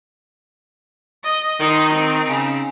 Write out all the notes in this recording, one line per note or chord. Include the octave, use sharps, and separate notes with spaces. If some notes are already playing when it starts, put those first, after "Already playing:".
D#5
D#3 D#4 C6
C4 D#4
C#3